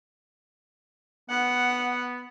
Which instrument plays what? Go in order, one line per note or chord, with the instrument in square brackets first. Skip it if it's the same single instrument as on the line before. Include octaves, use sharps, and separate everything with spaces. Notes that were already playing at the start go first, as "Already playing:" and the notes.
[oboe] B3 [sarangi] F#5